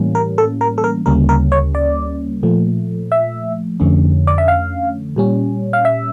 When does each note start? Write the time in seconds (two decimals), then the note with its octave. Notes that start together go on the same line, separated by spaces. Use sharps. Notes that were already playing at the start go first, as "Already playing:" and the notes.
Already playing: A2 E3 G3 A#3 C#4
0.15 A#4
0.38 A4
0.61 A#4
0.78 A4
0.84 A#4
1.06 D2 C#3 G3 A#3 C#4 A#4
1.29 A#4
1.52 C#5
1.75 D5
2.43 A#2 F3 A3
3.12 E5
3.80 F2 D3 A3 C#4
4.27 D5
4.38 E5
4.48 F5
5.16 A#2 G3 C#4
5.73 F5
5.85 E5